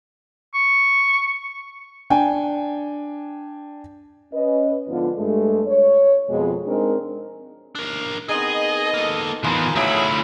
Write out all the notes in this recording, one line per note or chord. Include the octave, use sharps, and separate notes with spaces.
C#6
D4 G5 G#5
C#4 B4 D#5
G#2 D3 F3 B3 F4
G2 G#3 A3
C#5
F2 B2 G#3
G#3 C4 D4 D#4 A#4
D4 A#4
D#3 B3 C4 G#4 D#5
A#3 A4
E3 B3 D#4 F4 G#4 A#4 C5
D2 F#3 A3 E4 G#4 D5 B5